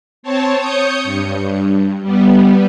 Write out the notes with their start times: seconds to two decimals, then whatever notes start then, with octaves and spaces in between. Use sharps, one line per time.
0.23 C4 C#5 A5
0.57 C#5 D#6 G6 C#7
1.04 G2
2.02 G3 B3